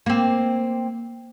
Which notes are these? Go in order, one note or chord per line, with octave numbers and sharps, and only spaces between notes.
A#3 C4